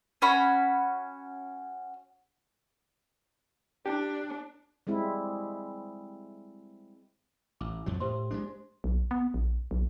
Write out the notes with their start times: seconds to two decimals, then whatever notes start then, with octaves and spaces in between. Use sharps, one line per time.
0.22 C#4 F#4 B5
3.86 D4 G4
4.87 G3 G#3 C4 E4
7.61 A1 D6
7.86 F2 F3 F#3
8.00 A2 G4 C5 C6
8.31 G#3 A#3 D4
8.84 B1
9.11 B3
9.34 A#1
9.71 B1